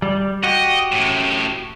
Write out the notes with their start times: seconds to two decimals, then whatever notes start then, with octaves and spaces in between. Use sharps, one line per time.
0.02 G3
0.43 F#4 G4 D#5
0.92 F#2 A2